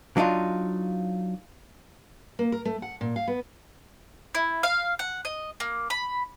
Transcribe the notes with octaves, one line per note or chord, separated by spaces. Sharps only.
F#3 D4 D#4 F4
A#3
A#4
A3
F#5
A#2
F5
B3
E4
F5
F#5
D#5
A#3
B5